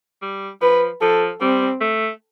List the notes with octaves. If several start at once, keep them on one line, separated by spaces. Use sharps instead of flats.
G3
F3 B4
F3 A4
G3 C4
A3